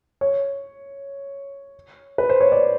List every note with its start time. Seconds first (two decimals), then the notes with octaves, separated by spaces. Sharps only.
0.21 C#5
2.18 B4
2.29 C5
2.41 C#5
2.52 D5